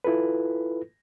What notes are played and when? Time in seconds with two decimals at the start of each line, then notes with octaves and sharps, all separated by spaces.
0.04 E4 F4 A4 B4